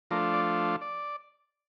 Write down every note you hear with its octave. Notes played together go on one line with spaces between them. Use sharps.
F3 A3 D4 F4 A#4
D5
D5